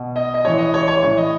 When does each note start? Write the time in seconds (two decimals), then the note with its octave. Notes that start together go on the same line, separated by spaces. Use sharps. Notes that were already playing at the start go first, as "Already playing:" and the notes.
Already playing: B2
0.16 D#5
0.34 D#5
0.45 A2 E3 C#5
0.58 D#5
0.74 C#5
0.88 C#5
1.03 A2 E3 C#5
1.17 D#5